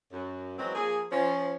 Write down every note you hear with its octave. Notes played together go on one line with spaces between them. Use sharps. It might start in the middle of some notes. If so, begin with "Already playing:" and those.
F#2
E3 F#3 G#3 C4
F3 A#3 G#4
F3 C#4